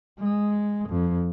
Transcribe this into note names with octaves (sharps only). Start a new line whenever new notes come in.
G#3
F2